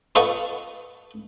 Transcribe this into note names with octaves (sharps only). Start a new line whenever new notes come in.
F4 A4 B4 D#5 F#5 C#6